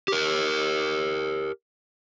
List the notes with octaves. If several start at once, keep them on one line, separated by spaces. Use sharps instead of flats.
G4 A#4